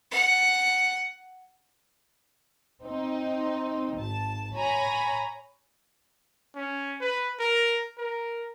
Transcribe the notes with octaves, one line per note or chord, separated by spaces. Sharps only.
F#5
C4 D#4
G#1 A5
C#5 G#5 A#5 B5
C#4
B4
A#4
A#4